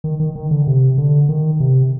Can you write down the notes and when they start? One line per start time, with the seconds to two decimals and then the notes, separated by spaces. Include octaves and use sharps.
0.04 D#3
0.20 D#3
0.36 D#3
0.51 D3
0.67 C3
0.98 D3
1.29 D#3
1.60 C3